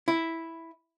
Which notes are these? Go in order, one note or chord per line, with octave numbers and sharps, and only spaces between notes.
E4